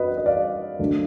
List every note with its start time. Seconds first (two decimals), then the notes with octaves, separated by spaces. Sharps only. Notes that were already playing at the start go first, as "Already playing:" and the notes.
Already playing: F#4 B4 D#5
0.17 D#5
0.26 D5 F5
0.79 D2 D3 F#3 D4